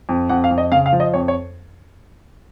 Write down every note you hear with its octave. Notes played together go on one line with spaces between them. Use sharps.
F2
F2 F#5
F5
F2
D#5
C#3 F5
F5
F3
D#5
F2 C#5
C#5